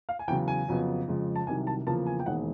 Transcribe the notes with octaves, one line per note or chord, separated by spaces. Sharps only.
F5
G#5
E2 C#3 F#3 G5
G#5
F2 C#3 F#3 B3
F2 C#3 F3 G#3
A5
C2 C3 D#3 F#3 G#5
A5
E2 C#3 F3 A#3 A5
G#5
G5
E1 D#2 D#3 G#3 F#5